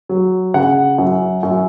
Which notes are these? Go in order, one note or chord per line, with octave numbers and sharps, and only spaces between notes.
F#3
C#3 F#5
F#2
F#2